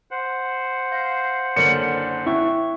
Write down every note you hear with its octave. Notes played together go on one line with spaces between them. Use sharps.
C5 F#5
F5 G6 A#6
F#1 D3 A#4 C#5 D5 C#7 F#7
C4 E4 C#6